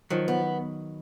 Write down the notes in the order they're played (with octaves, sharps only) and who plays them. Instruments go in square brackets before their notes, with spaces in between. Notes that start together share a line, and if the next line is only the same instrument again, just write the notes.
[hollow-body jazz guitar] D#3 F#3 [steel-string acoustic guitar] F3
[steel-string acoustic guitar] B3